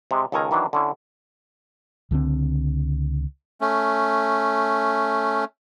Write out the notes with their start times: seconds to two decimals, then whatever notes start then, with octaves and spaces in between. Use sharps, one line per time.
0.11 C3 G#3
0.32 C#2 D#3 A4 A#4 G#5 A#5
0.51 D#3 E3 F#3 D4
0.73 D3 C#4 E4
2.11 C#2 D3 E3 C4
3.61 A3 C#4